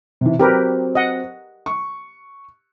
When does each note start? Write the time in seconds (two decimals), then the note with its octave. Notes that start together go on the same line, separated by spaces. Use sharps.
0.21 C3 E3
0.40 F#3 C4 G4 A#4 B4
0.95 D#5 F#5
1.66 C#6